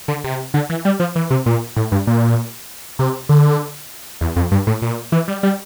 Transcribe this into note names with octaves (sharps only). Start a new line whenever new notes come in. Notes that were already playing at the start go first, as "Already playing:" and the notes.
D3
C3
D3
E3
G3
F3
E3
C3
A#2
A2
G2
A#2
C3
D3
E2
F2
G2
A2
A#2
E3
G3
G3